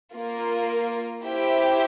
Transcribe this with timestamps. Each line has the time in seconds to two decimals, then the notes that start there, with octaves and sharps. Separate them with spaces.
0.14 A#3 F4 A#4
1.23 E4 G4 C5 E5 G5